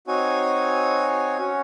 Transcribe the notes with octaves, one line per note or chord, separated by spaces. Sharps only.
C4 D#4 F#4 C#5 G#5
C#4 F#4 C#5